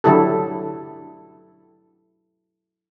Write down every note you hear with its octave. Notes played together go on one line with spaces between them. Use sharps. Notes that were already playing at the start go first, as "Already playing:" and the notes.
D3 F#3 E4 G4 A4